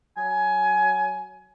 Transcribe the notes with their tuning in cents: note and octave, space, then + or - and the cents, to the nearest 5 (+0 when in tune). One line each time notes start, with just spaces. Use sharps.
F#3 +10 G#5 +20